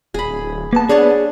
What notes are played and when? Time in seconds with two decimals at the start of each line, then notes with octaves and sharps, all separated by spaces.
0.14 D#1 G#4 B5
0.28 D1
0.73 A#3 B3 A5
0.89 D4 G#4 C#5 A5